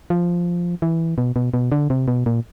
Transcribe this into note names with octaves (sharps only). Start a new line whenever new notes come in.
F3
E3
B2
B2
B2
D3
C3
B2
A#2